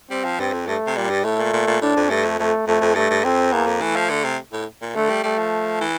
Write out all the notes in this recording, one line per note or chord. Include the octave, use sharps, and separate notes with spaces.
G3 C4
F3
G2 C4
F2
G2 A3
C3
A#2 G3
G2
A2 A3
A#2
A#2
A#2
A2 D4
F2
G2 A3
F2
F2 A3
F2 A3
F2
G2 A3
G2
F2 C4
E2 A#3
F2
E3 A3
F3
D3
C3
A2
A#2
D3 A3
G3
G3 A3
F3
E3